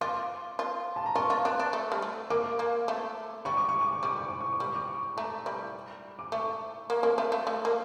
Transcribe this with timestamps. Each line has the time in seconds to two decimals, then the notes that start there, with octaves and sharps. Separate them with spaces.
0.01 F4 D6
0.59 F4
0.96 A5
1.06 A#5
1.15 F4 C#6
1.30 F4
1.45 D4
1.59 D4
1.73 A3
1.92 G3
2.02 A3
2.30 A#3 D6
2.59 A#3
2.88 A3
3.45 G3 C#6
3.57 D6
3.69 C#6
3.81 D6
3.92 C#6
4.03 G3 D6
4.16 C#6
4.28 D6
4.40 C#6
4.52 D6
4.60 G3 C#6
4.76 D6
4.87 C#6
5.17 A3 A#5
5.46 G3
6.19 D6
6.32 A3 C#6
6.90 A#3
7.03 A#3
7.18 A3
7.32 A3
7.47 A3
7.65 A#3